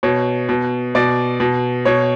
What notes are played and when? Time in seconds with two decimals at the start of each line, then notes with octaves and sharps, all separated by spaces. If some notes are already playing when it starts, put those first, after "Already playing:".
0.03 B2 C#5
0.49 B2
0.95 B2 D5
1.40 B2
1.85 B2 C#5